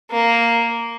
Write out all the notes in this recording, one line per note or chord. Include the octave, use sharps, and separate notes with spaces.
A#3